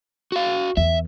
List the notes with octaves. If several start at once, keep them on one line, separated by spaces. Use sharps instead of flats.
F#4 F5
E2 E5